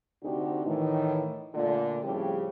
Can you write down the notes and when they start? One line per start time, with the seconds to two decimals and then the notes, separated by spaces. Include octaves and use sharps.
0.23 D2 C3 D4 D#4 F#4 G4
0.65 A2 D#3 E3
1.54 A#2 D3 A3 F4 D5
2.03 A2 C#3 F3 G3 C4 G4